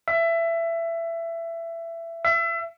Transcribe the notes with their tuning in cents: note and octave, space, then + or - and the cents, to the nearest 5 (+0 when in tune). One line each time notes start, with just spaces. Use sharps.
E5 +20
E5 +30